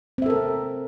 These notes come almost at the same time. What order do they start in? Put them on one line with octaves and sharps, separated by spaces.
C4 E5 A4 A#4